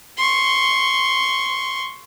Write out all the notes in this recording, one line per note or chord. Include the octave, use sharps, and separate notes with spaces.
C6 C#6